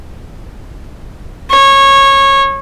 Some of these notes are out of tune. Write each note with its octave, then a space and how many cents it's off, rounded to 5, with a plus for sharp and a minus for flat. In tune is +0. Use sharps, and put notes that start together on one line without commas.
C#5 -20